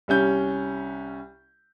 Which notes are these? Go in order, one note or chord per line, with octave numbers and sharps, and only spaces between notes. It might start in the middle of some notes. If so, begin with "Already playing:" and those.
C2 G3 C#4 G6